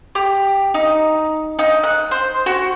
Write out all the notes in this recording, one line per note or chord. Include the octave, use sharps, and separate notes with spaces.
G4
D#4
D#4
F#6
C5
F#4